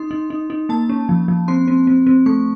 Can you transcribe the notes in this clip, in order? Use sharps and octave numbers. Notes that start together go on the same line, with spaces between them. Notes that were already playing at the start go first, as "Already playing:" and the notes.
Already playing: D#4 C6
D#4
D#4
D#4
A#3 A5
C#4
F3
F3
C4 C6
C4
C4
C4
A3 C#6